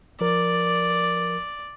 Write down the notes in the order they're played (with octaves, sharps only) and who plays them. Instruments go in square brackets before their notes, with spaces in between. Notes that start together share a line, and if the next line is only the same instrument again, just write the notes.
[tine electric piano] F3 A#4 [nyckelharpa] D5